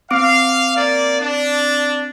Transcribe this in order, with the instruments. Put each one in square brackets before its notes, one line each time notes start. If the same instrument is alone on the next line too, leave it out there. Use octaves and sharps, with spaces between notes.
[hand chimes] C4 D6 D7 [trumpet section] F5
[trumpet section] A#3 D5
D4